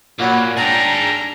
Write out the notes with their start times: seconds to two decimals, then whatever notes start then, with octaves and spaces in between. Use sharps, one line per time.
0.19 A#2 F#3 A#3 F#5 B5
0.57 D4 G#4 A#4 G5 A#5 A6